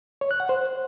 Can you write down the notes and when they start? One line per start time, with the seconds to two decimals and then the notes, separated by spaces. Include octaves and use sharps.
0.21 C#5
0.31 F#6
0.40 F#5
0.49 C5